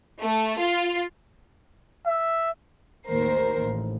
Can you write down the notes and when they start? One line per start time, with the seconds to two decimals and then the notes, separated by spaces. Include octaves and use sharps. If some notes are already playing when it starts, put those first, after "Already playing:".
0.22 A3
0.60 F4
2.07 E5
3.05 A1 D#2 A#4 C5 C7
3.58 A1